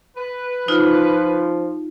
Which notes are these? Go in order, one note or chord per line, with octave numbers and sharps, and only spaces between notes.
B4
F3 D#4 F4